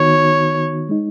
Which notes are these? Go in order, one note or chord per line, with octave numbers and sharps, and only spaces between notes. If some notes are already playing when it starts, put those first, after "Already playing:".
Already playing: D#3 B3 D#4 F#4 C#5
G#3 D#4